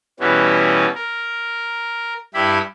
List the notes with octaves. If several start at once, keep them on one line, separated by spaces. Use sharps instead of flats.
B2 E3 G3 B3 C#4
A#4
G2 E4 G4 B5